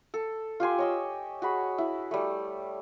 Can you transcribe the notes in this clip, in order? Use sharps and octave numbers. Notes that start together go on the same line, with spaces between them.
A4
F4 G4 G#5 C6
C#5 D#5 E6
F#4 G#4 B5
E4
G3 A3